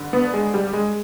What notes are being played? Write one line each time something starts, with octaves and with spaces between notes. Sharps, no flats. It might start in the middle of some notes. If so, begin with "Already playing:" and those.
Already playing: G2 D3
B3
G#3
G3
G#3